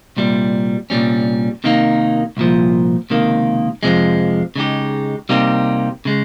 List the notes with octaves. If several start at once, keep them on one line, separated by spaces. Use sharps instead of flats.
C2 A#2 G3
C2 A#2 G3 C#4
C3 D#3 A#3 D#4
C2 A#2 F3
C#2 C3 D#3 A#3
F2 C3 F3 G#3
C#3 G#3 D#4 G4
C3 G3 A#3 D#4 G4
C#3 G#3